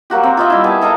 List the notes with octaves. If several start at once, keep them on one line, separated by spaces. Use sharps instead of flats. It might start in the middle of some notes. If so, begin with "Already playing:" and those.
F#3 A#3 F#4 G4
C4
F4 D#5 E5
G3 E4
B3 G4 G#4 A5
A4 D#5 F5 A#5